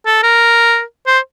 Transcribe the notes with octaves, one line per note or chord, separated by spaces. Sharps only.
A4
A#4
C5